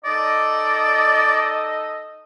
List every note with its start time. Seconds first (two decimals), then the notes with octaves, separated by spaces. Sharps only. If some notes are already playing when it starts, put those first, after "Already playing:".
0.05 D#4 A4 D5 D#5